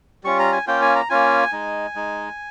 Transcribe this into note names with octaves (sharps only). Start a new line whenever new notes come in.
G3 C#4 F4 C#6
A#5
G#5
A#3 C#4 F4 G5
G#5
A#5
A#3 C#4 F4 G#5
G#3 D#4
G#3 D#4